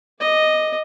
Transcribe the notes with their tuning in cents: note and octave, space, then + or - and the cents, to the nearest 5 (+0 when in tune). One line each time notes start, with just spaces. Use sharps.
D#5 +0 D6 +15